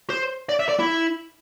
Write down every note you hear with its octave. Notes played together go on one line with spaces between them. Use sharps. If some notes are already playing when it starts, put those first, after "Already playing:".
C5
D5
E5
D5
E4